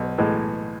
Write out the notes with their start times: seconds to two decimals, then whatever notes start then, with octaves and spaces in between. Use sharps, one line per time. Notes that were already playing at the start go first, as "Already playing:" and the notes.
Already playing: B1
0.18 A2 E3 G#3